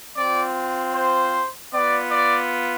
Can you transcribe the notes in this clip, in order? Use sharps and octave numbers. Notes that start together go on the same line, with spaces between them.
C4 F4 D5
C5
B3 F4 D5
D5